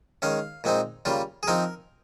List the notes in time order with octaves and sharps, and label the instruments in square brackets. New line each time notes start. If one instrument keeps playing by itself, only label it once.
[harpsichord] D#3 G#3 C#4 F5
A#2 G#3 C4 D#4
C#3 G3 A#3 F4
G#4
F3 C4 D#4 A#4